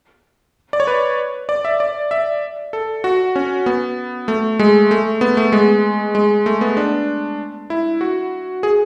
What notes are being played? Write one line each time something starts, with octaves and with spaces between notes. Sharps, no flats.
D5
C#5
B4
D5
E5
D5
E5
A4
F#4
C#4
B3
A3
G#3
A3
B3
A3
G#3
G#3
A3
B3
D4
E4
F#4
G#4